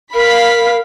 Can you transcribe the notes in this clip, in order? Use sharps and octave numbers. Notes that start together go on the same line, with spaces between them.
A#4 F5 B5 B6